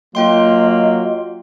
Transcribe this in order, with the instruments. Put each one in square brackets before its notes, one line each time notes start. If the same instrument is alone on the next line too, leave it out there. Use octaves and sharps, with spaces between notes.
[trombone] F#3 [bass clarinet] A#3 [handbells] F4 G5 C6 [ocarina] D#5